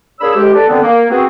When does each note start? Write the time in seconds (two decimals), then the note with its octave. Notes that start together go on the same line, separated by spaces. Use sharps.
0.20 A#3 D4 G#4 C#5 B5 E6
0.35 D2 G#3 G4
0.54 A4 B4 D5
0.68 B2 D3 D#3 B3 C4
0.82 A#3
1.10 B3 C4 F#4 G#4